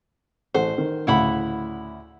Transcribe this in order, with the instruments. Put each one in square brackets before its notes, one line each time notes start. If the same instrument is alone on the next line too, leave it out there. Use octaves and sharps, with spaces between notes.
[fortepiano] A1 A3 F#5 [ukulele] C5
[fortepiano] D#3
[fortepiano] D2 A2 C#3 [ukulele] E4 F#5 B5